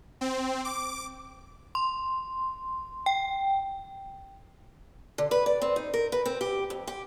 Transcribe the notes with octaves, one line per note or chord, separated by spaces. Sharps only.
C4
D6
C6
G5
D3
B4
D5
C4
D#4
A#4
B4
C4
G4
F2
G4